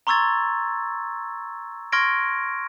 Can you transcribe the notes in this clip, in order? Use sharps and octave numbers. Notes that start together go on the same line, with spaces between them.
A#5 C6 C#6 E6 G#6 A6
C6 C#6 F6 G#6 A#6 D7